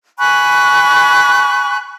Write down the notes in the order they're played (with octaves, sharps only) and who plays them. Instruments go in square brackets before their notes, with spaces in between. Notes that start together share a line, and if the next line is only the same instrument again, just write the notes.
[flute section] G#5 B5 C#6 F#6